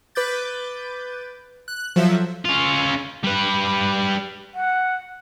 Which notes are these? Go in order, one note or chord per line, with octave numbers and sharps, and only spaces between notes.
B4 D6 G6 A6
F#6
F3 F#3 A4 E5
C#4 F4
G3 B4
F#5